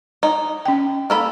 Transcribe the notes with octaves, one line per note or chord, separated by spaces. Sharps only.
D#4
C#4 G5
A#3 A4 B5